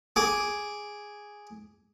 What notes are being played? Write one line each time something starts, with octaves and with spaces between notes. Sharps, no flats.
G#4 D6